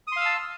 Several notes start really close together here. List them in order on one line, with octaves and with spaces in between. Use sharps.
D#6 C6 F5 E6 A5